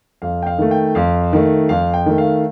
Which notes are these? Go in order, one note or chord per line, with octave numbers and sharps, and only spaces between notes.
F2 F5
G5
F5
D#3 A3
G5
F2 F5
D#3 A3
F2 F5
G5
D#3 A3
F5